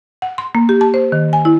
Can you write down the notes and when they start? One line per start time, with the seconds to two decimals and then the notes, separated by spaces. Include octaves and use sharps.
0.22 F#5
0.38 C6
0.55 A#3
0.69 G4
0.81 A5
0.94 C5
1.12 D#3
1.33 G#5
1.45 E4